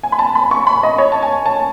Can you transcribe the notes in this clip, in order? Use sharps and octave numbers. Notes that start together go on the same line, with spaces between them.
G#5
B5
A5
B5
C#6
B5
D#5
C#5
A5
G#5
A5